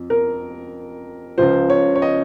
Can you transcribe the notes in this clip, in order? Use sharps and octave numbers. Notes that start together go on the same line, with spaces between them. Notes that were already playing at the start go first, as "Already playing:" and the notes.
Already playing: F2
A#4
C#2 C#3 F3 C5
C#5
C#5
D#5